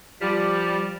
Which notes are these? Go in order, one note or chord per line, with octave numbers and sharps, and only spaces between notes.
F3 G3